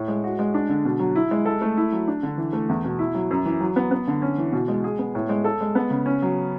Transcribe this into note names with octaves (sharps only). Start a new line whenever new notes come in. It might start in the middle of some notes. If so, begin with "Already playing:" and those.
Already playing: A2
G#3
F#4
G#3
D4
D3
B2
F#3
E4
G#3
A4
A3
E4
F#3
D4
D3
E3
A3
E2
B2
E4
F#3
F#2
E3
F#3
B3
B3
D3
C#4
E3
B2
G#3
G#4
B3
A2
G#3
A4
G#3
B3
C#3
C#4
F#3